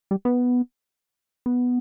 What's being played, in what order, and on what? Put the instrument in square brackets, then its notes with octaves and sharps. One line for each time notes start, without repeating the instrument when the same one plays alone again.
[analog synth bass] G3
B3
B3